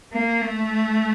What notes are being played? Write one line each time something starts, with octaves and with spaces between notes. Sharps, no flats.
A#3
A3